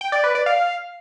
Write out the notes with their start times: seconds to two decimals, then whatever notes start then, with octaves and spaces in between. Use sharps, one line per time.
0.01 G5
0.12 D5
0.24 B4
0.35 D5
0.46 F5